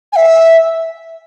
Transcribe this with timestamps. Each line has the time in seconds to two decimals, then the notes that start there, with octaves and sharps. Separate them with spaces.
0.13 G#5
0.16 E5